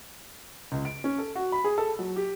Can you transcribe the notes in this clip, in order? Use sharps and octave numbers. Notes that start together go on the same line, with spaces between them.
C#2
D7
C#4
A4
F#4
B5
G#4
A4
F#3
G4